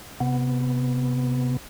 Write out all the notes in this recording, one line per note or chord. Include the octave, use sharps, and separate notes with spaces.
C3 B3